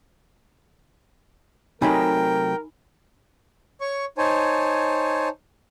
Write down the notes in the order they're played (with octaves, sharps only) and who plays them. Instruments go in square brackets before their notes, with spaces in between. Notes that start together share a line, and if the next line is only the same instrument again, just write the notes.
[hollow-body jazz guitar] C3 F#3 A3 [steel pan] D#4 G#5 B5 [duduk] A#4 [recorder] G5
[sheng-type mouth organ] C#5 C#6
D#4 C5 C#5 G#5 A5